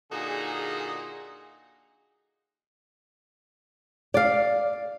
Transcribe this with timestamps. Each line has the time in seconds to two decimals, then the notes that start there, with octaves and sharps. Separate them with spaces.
0.11 A#2 D3 D#4 F#4 G#4
4.14 D5 F5